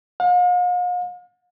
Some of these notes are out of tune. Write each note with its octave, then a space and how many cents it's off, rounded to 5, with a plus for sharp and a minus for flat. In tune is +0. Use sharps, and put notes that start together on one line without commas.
F5 +45